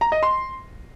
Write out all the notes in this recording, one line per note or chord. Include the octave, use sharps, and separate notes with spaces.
A#5
D#5
C6